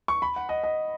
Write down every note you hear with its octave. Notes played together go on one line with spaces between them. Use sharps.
C#6
B5
F#5
D#5
D#5